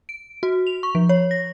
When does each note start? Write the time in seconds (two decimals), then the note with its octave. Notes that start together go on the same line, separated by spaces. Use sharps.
0.09 D7
0.43 F#4
0.67 F7
0.83 C#6
0.95 F3
1.09 C#5
1.31 A#6